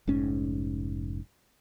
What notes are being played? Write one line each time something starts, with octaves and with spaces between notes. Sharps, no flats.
F1 G#2 C#4